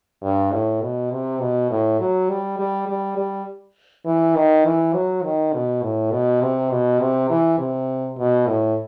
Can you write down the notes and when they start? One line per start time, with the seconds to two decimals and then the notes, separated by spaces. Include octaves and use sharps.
0.23 G2
0.53 A2
0.82 B2
1.11 C3
1.40 B2
1.71 A2
2.00 F#3
2.29 G3
2.59 G3
2.88 G3
3.17 G3
4.06 E3
4.36 D#3
4.65 E3
4.94 F#3
5.23 D#3
5.53 B2
5.82 A2
6.12 B2
6.41 C3
6.70 B2
7.00 C3
7.30 E3
7.59 C3
8.18 B2
8.47 A2